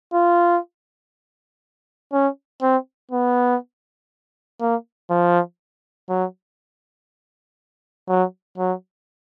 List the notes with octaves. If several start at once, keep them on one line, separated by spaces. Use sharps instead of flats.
F4
C#4
C4
B3
A#3
F3
F#3
F#3
F#3